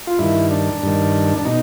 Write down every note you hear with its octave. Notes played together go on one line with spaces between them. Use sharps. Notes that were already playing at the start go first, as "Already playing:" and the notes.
F4
G2 D#3 E4
D4
G2 D#3
D4
B2 D#4